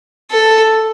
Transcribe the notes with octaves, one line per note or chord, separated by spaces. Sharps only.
A4